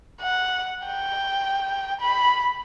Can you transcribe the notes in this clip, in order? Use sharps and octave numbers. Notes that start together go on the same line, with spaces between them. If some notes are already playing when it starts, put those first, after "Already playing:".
F#5
G5
B5